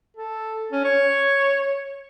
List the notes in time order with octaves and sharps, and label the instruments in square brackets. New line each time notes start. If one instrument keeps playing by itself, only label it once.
[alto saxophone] A4
C#4
C#5